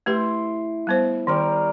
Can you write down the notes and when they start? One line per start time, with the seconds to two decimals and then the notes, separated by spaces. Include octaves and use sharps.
0.06 A3 E4 G4 B4 C6
0.87 G3 B3 C5
1.27 D#3 G3 A#4 C#5